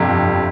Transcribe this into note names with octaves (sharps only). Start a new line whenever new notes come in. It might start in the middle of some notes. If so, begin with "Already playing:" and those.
Already playing: G1 F2 C3